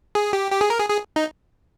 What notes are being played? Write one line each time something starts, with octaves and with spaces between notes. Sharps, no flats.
G#4
G4
G4
G#4
A#4
G#4
G#4
D#4